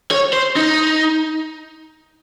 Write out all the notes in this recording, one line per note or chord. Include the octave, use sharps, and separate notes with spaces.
C#5
C5
D#4